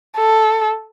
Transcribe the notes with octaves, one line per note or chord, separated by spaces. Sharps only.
A4